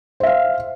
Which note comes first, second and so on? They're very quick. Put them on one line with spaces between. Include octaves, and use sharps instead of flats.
C5 E5 F5